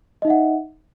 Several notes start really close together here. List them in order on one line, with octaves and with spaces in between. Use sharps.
D#5 D#4 E5 F#5